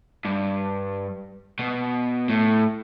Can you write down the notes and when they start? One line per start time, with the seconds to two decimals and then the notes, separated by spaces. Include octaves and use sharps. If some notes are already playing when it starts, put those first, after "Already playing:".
0.25 G2
1.59 B2
2.29 A2